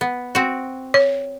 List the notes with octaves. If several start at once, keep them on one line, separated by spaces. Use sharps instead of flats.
B3
C4 F#4
C#5